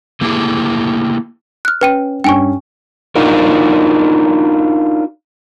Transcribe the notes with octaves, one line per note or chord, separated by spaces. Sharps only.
A3 A#3 E4 G4 G#4
F6 F#6
C#4 B4 G5 D#7
G2 C#4 G5 G#5 C#6
D4 D#4 F4 F#4 A#4